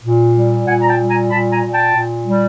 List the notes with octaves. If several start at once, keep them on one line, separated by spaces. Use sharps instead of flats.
A#2
G3
A#2 F#5 G#5
A#5
G5 A5
G3
G#5 A#5
A#2 A5 B5
G#5 A#5
A#2
G5 A5
A#2
G3